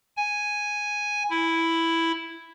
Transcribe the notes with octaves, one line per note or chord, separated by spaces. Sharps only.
G#5
E4